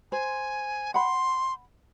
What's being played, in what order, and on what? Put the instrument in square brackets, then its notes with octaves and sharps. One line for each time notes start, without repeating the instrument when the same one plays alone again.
[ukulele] C5 [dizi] G#5
[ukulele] F#5 B5 [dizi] C6